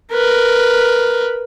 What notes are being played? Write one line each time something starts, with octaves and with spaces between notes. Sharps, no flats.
A#4 B4